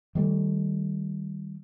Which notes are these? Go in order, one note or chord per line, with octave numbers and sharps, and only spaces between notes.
D#3 G3 A3